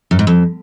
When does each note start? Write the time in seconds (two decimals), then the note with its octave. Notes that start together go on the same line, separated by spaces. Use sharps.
0.11 F#2
0.19 G#2
0.27 F2